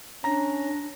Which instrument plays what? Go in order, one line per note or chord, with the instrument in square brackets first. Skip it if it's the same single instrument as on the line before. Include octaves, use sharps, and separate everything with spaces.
[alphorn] C#4 [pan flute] D4 [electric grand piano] A#5 A#6